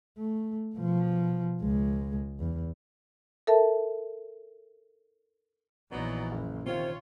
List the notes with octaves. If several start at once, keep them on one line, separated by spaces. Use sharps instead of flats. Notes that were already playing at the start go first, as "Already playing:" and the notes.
A3
B2 F3
C#2 G#3
E2
A4 A#4 E5 A5
A#1 E3 F#3 B3 D#4 D5
F#1
C3 D#3 F4 C5 C#5